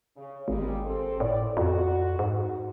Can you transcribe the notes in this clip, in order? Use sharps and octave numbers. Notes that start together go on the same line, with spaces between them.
C#3
G#1 G3 G#3 A#3
C4 A4
A2 D5
F2 F#4
G#2